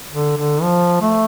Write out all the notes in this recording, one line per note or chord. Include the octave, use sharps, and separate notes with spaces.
D3
D3
F3
A3